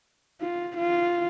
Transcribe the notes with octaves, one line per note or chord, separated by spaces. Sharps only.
F4
F4